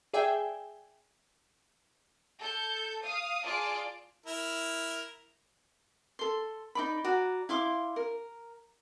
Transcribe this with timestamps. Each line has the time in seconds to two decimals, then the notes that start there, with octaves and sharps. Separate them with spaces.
0.14 G#4 D5 E5 G5 G#5
2.40 A4 G6
3.02 F5 D#6
3.44 F4 G#4 D5 A5 D6
4.26 E4 A#4
6.19 A4 C6
6.75 D#4 D5 B5
7.04 F#4 D5 A#5
7.49 E4 F5 C6 D6
7.96 A#4